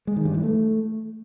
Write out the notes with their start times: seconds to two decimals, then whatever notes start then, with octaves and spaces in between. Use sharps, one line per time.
0.07 G#3
0.16 D#3
0.25 G2
0.34 E3
0.43 A3